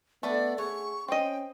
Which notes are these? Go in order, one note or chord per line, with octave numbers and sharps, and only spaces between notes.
A3 B3 D4 A4 B4 D5
G#4 C#5 F#5 C#6
C4 C#4 D#5 G5